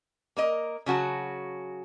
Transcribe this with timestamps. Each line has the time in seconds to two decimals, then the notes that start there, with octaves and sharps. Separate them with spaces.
0.37 A#3 A#4 D#5
0.86 C#3 F#3 F#4 A5